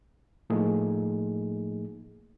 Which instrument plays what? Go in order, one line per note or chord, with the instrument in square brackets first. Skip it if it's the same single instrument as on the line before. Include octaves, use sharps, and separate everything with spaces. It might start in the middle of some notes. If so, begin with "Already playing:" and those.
[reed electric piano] A2 F3 A3 A#3 D#4 G#4